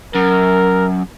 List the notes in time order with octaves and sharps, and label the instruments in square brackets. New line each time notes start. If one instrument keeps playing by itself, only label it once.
[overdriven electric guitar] F#2 [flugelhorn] A#4